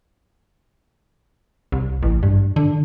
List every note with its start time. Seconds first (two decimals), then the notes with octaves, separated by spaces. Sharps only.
1.72 C2
2.03 A1
2.23 G2
2.56 D3